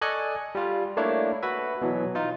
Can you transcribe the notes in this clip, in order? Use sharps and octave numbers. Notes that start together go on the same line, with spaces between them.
A4 D5 D#5 G#5 C#6 F#6
G3 F4
A3 A#3 D4 E4 C#5
F#4 B4 E5
B2 E3 F#3
D#4 F4